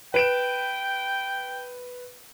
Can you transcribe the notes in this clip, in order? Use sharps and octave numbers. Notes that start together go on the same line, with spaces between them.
B4 G5 D7 E7